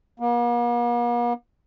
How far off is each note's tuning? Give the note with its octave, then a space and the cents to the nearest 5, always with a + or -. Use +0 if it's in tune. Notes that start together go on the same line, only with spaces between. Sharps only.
A#3 +45